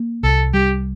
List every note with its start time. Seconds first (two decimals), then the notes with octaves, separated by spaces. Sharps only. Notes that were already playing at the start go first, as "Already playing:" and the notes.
Already playing: A#3
0.23 C2 A4
0.53 G3 G4